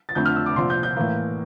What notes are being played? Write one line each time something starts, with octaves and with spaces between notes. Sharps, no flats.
A6
F2 D3 A3 D4 G6
F6
E6
D6
C2 A#2 F3 C6
G6
G6
A2 E3 A#3